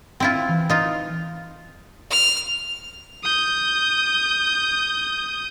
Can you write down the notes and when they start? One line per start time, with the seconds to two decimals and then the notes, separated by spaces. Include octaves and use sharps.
0.20 C4 E4 F4
0.48 E3 F6
0.70 D#4 F4
2.10 F6
3.23 D#6 G6